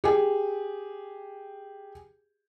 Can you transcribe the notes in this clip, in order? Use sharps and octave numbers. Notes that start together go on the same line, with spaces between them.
G4 G#4